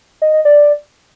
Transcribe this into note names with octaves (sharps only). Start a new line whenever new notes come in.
D#5
D#5
D5